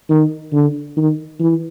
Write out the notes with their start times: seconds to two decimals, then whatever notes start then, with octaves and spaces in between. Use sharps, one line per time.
0.10 D#3
0.53 D3
0.97 D#3
1.40 E3